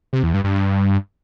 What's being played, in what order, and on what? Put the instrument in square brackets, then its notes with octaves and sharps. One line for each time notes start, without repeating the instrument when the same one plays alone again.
[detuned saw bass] C3
E2
G2
G2
G2